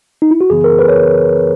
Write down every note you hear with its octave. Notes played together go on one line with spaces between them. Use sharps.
D#4
E4
F#4
F#2 C#3 E3 B3 G#4
A#4
B4
C#5